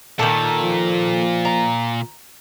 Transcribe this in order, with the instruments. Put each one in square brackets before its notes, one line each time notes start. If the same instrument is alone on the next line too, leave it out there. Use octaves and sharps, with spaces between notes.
[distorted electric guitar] A#2 [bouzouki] D#3 A#3 A4
[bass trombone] F3
[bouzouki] A#5